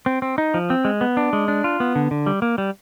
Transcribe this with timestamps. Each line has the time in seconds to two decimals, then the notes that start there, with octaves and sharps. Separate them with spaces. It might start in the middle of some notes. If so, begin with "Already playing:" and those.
0.06 C4
0.22 C4
0.38 D#4
0.54 F3
0.70 C4
0.85 G#3
1.01 B3
1.17 D4
1.33 G#3
1.48 D4
1.64 F4
1.80 B3
1.96 D3
2.11 D3
2.26 G3
2.42 A#3
2.58 G3